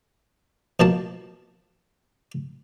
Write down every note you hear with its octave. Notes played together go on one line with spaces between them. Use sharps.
B2 F3 A#3 A5